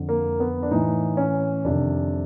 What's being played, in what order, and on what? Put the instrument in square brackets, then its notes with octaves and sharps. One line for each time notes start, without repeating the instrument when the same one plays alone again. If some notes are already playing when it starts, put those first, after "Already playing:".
Already playing: [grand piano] F2 D3
A#3
B3
D4
A2 E3 D#4
C#4
F2 C3 D#3 D4